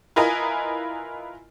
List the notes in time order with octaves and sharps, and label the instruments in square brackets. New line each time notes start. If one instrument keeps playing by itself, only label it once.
[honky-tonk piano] E4 F4 A#4 B4 D#5 G#5